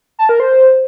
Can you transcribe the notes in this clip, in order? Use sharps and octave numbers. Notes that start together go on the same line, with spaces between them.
A5
A#4
C5